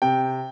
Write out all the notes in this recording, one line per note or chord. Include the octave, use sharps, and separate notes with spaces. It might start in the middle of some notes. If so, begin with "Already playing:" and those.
C3 G5